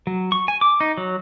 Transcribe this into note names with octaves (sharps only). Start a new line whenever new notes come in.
F#3
C#6
G#5
D6
D#4
F#3